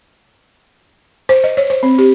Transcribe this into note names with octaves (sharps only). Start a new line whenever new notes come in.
C5
D#5
C#5
C5
C4
G4